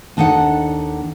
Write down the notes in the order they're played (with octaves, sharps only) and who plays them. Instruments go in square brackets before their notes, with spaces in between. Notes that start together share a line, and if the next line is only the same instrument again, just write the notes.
[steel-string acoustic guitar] D#2 D4 D#4 A4 F#5